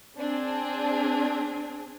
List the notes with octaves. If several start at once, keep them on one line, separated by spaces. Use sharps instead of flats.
C4 D4 G#4